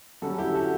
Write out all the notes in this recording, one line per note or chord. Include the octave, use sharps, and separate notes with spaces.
F#2 D3 G3 C#4 F#4 A4
E4 G4
F#4 A4